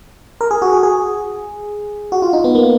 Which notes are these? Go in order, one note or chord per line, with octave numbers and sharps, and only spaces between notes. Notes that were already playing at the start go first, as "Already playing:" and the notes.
A#4
G#4
F#4
G#4
G#4
F#4
F4
D#4
B3
A#3